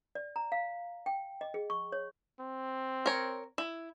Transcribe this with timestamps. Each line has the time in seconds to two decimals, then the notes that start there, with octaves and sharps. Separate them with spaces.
0.15 D5
0.36 A#5
0.52 F5
1.06 G5
1.41 D#5
1.54 G#4
1.70 C#6
1.92 C#5
2.40 C4
3.06 A#4 C#5
3.58 E4